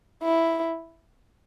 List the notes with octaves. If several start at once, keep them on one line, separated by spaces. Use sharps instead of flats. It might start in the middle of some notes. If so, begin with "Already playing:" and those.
E4